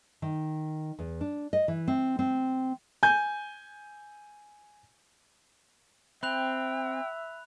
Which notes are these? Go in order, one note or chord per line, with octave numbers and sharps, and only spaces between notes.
D#3
E2
D4
D#5
E3
C4
C4
G#5 G6
C4 E5 G5 B5 F#6 F7